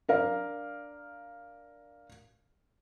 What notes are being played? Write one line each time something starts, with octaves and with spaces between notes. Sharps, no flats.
D4 A#4 F5